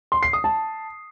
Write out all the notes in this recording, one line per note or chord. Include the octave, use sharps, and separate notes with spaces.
C6
C7
D#6
A5